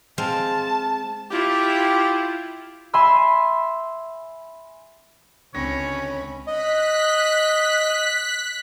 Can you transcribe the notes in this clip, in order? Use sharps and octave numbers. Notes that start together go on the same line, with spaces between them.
G#3 C4 F5 A5
E4 F4 G4
E5 G#5 B5 C6 E6
C#2 D3 C4 C#4 C#5 B5 A#6
D#5 F#6 B6